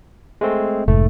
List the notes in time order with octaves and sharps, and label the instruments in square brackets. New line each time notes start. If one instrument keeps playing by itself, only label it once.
[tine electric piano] G#3 A3 C4
[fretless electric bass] F1 G#2 [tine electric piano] A3